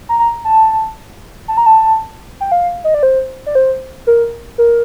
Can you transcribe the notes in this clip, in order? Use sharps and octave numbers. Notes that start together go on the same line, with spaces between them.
A#5
A#5
A5
A5
A#5
A5
G5
F5
D#5
D5
C5
D5
C5
A#4
A#4